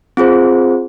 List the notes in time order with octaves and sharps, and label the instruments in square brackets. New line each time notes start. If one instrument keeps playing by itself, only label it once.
[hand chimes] C4 F4 G#4 C5